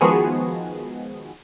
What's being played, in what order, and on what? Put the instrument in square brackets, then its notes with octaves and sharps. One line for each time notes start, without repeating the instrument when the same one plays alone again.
[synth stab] D#3 F3 G#3 B3 F#4 G#4